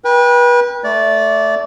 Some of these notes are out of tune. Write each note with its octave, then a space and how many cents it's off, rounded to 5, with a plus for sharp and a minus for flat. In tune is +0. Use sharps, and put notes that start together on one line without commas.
B4 -35 G5 +20
A3 +0 D5 -20